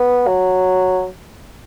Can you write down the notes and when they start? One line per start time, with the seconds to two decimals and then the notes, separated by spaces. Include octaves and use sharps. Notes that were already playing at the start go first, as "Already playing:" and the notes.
Already playing: B3
0.27 F#3